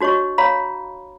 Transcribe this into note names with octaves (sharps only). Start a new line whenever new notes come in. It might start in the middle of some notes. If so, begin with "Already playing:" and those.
D4 F#4 C#5 D#5 C#6
C#5 F5 A#5 B5